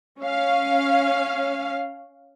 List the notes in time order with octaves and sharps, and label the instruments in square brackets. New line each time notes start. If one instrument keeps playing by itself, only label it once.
[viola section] C#4 F5